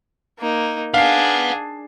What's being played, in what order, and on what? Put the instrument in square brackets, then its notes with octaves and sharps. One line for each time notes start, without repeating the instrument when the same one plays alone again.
[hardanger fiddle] A#3 D#4
[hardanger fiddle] D4 G#4 [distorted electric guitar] B4 F#5 [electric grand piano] F5 C7